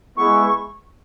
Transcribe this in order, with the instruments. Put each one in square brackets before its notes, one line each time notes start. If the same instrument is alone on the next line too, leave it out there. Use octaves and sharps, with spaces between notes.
[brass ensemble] G#3 B3 E4 [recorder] C#6